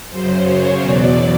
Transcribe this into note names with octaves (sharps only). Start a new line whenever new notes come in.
F#2 C#3 F#3 C5
C#5
E2 B2 F#3 D5